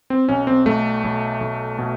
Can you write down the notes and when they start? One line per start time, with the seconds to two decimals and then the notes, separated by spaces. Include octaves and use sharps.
0.10 C4
0.29 B1 C#4
0.47 C4
0.66 B1 A3
1.04 B1
1.41 B1
1.79 B2